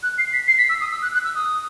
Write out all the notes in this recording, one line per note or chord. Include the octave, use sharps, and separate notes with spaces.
F#6
C7
B6
C7
B6
E6
D#6
E6
F#6
F#6
E6
D#6